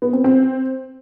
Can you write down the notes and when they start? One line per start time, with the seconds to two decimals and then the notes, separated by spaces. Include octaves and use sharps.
0.02 B3
0.13 C4
0.24 C4